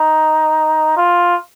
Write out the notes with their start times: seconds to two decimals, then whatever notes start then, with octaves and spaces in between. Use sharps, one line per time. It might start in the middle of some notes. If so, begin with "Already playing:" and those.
Already playing: D#4
0.97 F4